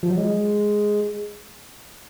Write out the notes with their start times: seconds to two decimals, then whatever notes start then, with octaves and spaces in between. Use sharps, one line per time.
0.03 F3
0.10 F#3
0.18 G#3